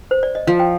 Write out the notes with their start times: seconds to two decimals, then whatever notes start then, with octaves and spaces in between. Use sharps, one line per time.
0.11 C5
0.23 D5
0.35 D#5
0.47 F3 F5
0.59 G5